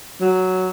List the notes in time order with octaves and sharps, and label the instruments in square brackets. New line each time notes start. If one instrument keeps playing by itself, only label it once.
[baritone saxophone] F#3